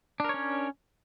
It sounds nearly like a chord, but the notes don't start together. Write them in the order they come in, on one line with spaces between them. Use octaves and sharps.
D4 A#4 C#5 C#4